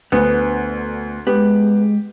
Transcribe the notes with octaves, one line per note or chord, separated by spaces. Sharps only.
D2 D3 B3
G#3 B3 G4